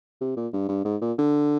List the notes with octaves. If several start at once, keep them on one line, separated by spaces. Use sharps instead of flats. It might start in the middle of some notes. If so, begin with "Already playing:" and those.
C3
A#2
G2
G2
G#2
A#2
D3